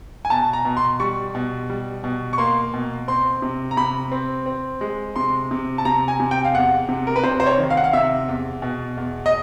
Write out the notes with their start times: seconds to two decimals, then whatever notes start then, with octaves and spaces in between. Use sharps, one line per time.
0.25 G#5
0.30 B2 A5
0.53 A#5
0.65 B2
0.77 C6
1.00 G3 C#6
1.35 B2
1.70 G3
2.04 B2
2.33 C#6
2.38 A#3 C6
2.74 B2
3.08 C4 C6
3.42 C3
3.71 A#5
3.77 C3 B5
4.12 C4
4.46 C4
4.81 G#3
5.16 C3 C6
5.51 C3
5.78 A5
5.85 C3 A#5
6.08 G#5
6.20 C3
6.31 G5
6.45 F5
6.54 E2 F#5
6.89 C3
7.07 A#4
7.16 B4
7.23 C3 C5
7.40 C5
7.46 C#5
7.58 D#3
7.70 F5
7.77 F#5
7.84 F5
7.93 C3 E5
8.28 E2
8.62 B2
8.97 E2
9.26 D#5